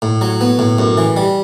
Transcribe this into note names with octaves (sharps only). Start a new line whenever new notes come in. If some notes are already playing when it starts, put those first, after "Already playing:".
A2
F#3
B3
A2
F#2
E3
G3